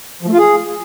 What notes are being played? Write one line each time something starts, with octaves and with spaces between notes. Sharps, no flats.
F3
A3
F4
G#4